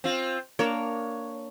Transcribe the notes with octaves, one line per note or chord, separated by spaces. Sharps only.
C4 F4
A#3 D4 A#4 C#5